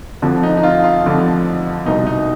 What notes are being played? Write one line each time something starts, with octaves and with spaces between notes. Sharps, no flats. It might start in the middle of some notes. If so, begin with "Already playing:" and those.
F2 D3 F3
D#4
D#4
F4
F4
F2 D3 F3
C2 B2 D#4
D#4